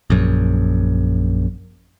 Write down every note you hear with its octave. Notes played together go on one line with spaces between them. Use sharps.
A#1 F#2